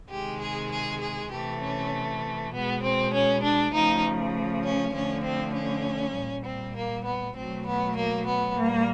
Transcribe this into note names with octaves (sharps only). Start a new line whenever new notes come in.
C3 D#3 G#3 G4
G#4
G#4
G#4
C3 E3 A3 G4
C#4
B2 G#3 B3
C4
C#4
D4
C#3 F3 A3 D#4
C#4
D3 F3 A3 C#4
C4
C#4
A#2 G3
C4
A#3
B3
B2 F#3 A3 C4
B3
A#3
B3
A#2 G3 A#3